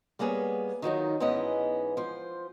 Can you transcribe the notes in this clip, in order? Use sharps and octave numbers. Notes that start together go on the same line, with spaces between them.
G3 A#3 B3 G#4 B4 C#5
D#3 F3 F#3 D#4
G#2 E3 B3 C#4 D#5
F3 C5